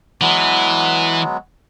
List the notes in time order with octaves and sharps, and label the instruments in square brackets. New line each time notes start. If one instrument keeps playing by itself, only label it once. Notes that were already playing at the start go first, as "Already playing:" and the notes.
[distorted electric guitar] E3 [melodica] F#3 G#3 B3